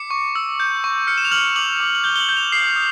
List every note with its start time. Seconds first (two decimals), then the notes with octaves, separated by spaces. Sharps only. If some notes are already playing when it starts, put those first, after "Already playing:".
Already playing: D6 C#7
0.11 C#6
0.35 E6
0.60 G6
0.84 C#6
1.07 F6 C#7
1.18 E7
1.25 F7
1.31 F6 F#7
1.56 D6 F#7
1.80 D6
1.95 F#7
2.04 G6 G7
2.16 G7
2.20 F#7
2.29 G6
2.37 F7
2.52 D#6 C7
2.76 D#6